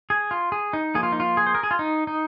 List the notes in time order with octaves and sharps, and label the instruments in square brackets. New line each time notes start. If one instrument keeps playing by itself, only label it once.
[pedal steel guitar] G#4
F4
G#4
D#4
F3 A#3 G#4
F4
D#4
F4
G#4
C5
A#4
G#4
F4
D#4
D#4